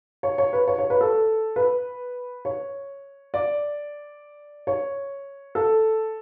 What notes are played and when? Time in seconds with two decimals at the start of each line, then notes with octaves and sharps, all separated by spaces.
0.23 C#5
0.38 C#5
0.53 B4
0.68 C#5
0.78 C#5
0.90 B4
1.01 A4
1.56 B4
2.45 C#5
3.34 D5
4.67 C#5
5.55 A4